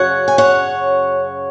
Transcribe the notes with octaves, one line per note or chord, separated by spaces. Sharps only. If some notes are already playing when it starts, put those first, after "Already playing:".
Already playing: F#2 C#3 F#3 C#5 F#5
G#5
C#5 F#5